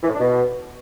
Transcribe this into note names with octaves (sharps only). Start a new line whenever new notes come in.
E3
A2
D4
B2